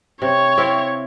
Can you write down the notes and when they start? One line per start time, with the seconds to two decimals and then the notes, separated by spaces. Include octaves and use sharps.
0.22 C3 C#5
0.58 C4 E4 F5